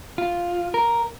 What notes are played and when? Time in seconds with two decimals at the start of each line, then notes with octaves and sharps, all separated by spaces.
0.18 F4
0.74 A#4